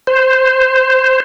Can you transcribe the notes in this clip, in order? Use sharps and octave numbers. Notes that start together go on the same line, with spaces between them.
C5